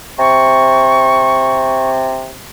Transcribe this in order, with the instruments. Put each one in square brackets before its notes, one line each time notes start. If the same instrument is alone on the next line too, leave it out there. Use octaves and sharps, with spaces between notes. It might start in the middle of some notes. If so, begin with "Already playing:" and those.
[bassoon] C3 [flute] C#6